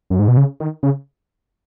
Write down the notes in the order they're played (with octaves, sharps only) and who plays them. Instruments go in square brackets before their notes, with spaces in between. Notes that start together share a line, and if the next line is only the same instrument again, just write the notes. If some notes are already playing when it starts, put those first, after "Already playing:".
[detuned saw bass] F#2
G#2
B2
C#3
D#3
C#3